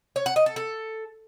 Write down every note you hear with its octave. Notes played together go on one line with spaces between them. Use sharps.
C#5
F#5
D#5
A4
A4